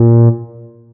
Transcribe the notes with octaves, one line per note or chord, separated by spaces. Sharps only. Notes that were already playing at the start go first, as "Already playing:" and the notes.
Already playing: A#2